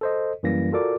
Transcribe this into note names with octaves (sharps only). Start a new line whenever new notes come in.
A4 C5 D#5
F#2 E3 G3 A#3 A#6
F4 F#4 A4 A#4 D5 D6